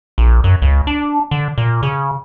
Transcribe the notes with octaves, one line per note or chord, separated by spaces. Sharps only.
A#1
F#2
C#2
D4
D3
A#2
C#3